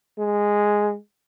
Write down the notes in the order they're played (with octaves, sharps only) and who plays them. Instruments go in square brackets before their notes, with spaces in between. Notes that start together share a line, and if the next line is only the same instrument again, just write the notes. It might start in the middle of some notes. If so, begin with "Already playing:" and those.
[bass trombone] G#3